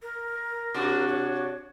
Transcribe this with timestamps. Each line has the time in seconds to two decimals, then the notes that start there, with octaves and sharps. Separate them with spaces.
0.02 A#4
0.74 C3 D4 F#4
1.08 C#5